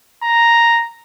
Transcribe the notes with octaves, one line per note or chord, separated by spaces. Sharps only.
A#5